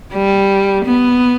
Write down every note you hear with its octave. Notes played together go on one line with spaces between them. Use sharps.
G3
B3